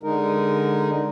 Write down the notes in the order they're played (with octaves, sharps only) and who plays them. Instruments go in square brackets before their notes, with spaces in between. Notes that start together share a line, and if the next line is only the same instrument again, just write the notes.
[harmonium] D3 G#3 D#4 A#4